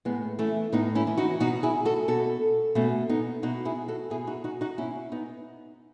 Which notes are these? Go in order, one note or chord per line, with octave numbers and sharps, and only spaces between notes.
A2 G#3 B3
E3 A3 C#4
A2 B3 D#4
C#4 E4
E3
D#4 F#4
B2 D#4 F#4
E4 G#4
F#4 A4
B2 F#4 A4
B2 A3 C#4
B3 D#4
B2 D#4 F#4
E4 G#4
F#4 A4
B2 E4 G#4
D#4 F#4
D#4 F#4
D#4 F#4
B2 C#4 E4
B3 D#4